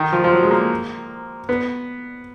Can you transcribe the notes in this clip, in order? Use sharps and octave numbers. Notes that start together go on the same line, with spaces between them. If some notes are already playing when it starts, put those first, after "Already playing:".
Already playing: D#3
F3
F3
F#3
G#3
A#3
B3